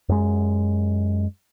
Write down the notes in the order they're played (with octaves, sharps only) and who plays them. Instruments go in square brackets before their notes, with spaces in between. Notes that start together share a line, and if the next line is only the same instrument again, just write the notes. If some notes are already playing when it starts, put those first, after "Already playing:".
[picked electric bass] F#2 G#3